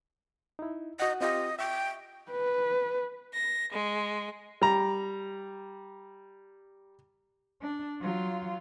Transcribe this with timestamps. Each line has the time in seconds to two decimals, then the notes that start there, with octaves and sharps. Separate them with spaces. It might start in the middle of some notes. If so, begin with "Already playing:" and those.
0.59 D#4 E4
1.00 F#4 D#5 F#5
1.21 C4 F4 G4 D#5
1.59 E5 G5 C#6
2.31 B4
3.34 A#6
3.72 G#3
4.62 G3 A#5
7.62 D4
8.01 F#3 F4